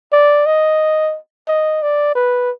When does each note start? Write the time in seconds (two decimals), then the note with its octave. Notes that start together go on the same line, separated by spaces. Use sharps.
0.12 D5
0.46 D#5
1.48 D#5
1.82 D5
2.15 B4